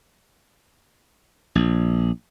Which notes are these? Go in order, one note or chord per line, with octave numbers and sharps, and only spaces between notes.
A#1